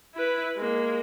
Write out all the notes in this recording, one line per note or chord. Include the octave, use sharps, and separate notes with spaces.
E4 B4
G#3 A#3